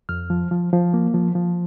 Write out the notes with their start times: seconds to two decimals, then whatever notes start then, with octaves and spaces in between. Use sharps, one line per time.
0.09 F2 F6
0.30 F3
0.51 F3
0.73 F3
0.94 A#3
1.14 F3
1.35 F3